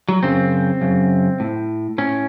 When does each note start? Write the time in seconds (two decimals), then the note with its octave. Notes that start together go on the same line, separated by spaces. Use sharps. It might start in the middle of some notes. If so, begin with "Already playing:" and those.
0.09 F#3
0.23 F#2 C#3 C4
0.81 F#2 C#3
1.40 A2
1.98 A2 C#4